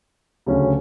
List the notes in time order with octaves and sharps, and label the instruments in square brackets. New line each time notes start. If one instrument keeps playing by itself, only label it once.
[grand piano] D2 C#3 F#3 C#4